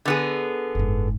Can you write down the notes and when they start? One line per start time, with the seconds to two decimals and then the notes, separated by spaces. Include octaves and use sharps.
0.05 D3 B3 G#4
0.75 F#1 G#2